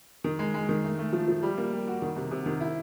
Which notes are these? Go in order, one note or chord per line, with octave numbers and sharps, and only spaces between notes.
D#3
G#3
G#3
D#3
A3
A3
F3
F3
G3
A#3
G3
F#4
D#3
C3
C3
D#3
E4